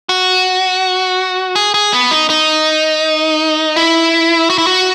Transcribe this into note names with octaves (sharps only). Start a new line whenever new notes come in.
F#4
G#4
G#4
B3
D#4
D#4
E4
F#4
E4
F#4